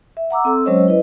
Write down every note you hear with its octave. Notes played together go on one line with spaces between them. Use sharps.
E5
F#5 A#5 D6 E6
C4 A4 E6
F#3 G#3 C#4 C5 C#5 D#5
E4 B4 D#5